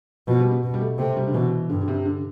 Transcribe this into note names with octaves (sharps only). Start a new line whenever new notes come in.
B2 F3
G3
B3
B2
G3
A3
C3 A3
G3
D3
B2 E3
G2 D3
D3
C3
D3